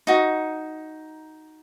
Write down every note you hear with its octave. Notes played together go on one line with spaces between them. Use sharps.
D#4 F#4